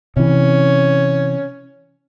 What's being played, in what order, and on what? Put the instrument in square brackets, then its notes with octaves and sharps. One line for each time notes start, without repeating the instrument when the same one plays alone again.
[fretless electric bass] C3 E3 [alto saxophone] C#4